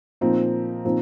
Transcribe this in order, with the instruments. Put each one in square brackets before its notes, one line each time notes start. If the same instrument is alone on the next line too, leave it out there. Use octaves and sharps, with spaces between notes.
[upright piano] A#2 F3 C4 D#4
A#2 F3 C4 D#4